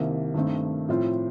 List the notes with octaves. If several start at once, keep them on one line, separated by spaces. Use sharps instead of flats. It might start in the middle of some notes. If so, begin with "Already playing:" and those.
Already playing: C2 C3 D#3 A#3
G2 D#3 A3 C4
A2 F3 C4 F4